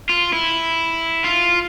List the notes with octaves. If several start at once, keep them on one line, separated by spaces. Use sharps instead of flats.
F4
E4
F4